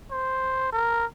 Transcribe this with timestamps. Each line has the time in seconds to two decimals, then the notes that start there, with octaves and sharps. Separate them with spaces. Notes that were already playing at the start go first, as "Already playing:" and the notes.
0.11 C5
0.73 A#4